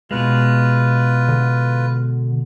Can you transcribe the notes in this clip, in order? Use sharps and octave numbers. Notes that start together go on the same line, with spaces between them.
B2 G#3 F4 B4
D3